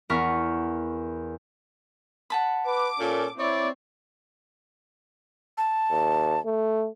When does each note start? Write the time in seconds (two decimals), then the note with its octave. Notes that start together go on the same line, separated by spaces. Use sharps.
0.09 E2 B3 A#4 C#6 F6 B6
2.30 F#5 A5 B5
2.66 B4 D6
3.00 A#2 C#4 A4
3.38 C4 E4 C#5 D5
5.58 A5
5.91 D#2
6.46 A3